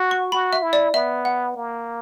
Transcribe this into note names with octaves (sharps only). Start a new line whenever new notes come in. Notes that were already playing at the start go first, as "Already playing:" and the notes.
Already playing: F#4
C#6
F#4 B5
E5
E4
D5
B3 E5
F#5
A#3